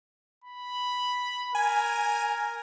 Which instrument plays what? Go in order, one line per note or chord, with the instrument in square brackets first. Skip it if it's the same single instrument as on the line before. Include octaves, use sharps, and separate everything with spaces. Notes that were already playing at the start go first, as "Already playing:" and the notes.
[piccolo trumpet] B5
[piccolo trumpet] A#4 [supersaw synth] G#5